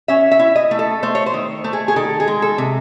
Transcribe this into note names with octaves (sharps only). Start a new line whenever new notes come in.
C#4 E5
E5
E4
D#5
A3
A4
A3 C5
C#5
C5
D#3
A3
G#4
G#4
D#3 A4
G#4
G#3
A4
C3